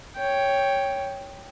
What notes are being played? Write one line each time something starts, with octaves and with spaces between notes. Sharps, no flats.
C#5 G5